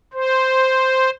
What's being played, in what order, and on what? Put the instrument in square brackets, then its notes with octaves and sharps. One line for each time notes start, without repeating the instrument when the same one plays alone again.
[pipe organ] C5